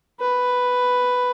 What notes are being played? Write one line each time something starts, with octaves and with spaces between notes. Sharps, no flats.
B4